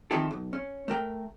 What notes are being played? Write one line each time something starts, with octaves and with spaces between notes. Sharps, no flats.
D#3 F3 C4 E4 G4 A4
B1
C#4
A3 A#4 G5